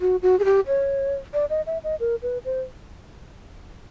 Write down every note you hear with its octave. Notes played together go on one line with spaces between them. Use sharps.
F#4
F#4
G#4
G4
C#5
D5
D#5
E5
D#5
A#4
B4
C5